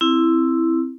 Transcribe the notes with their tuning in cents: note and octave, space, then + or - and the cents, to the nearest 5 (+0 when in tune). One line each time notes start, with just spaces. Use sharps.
C4 +0 E4 +0